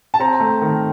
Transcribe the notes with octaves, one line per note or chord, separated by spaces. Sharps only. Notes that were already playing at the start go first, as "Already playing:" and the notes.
A5
C4 A#5
A3
D#3